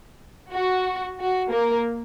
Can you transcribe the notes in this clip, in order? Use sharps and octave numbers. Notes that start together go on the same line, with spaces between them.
F#4
F#4
A#3 A#4